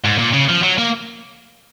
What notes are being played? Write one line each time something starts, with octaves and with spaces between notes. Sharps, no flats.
G#2
A#2
C#3
F3
F#3
A#3